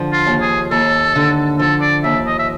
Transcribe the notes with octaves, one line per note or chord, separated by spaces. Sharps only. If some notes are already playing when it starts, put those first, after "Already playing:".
Already playing: D3 F3
F4
D#2
G#4
D#2 A4
D3
F3 A4
D5
D#2 E5
D#5
E5